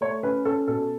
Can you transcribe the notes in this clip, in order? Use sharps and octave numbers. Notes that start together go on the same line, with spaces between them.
A3 C#5
C#4 B4
C#4 A4
B2 A4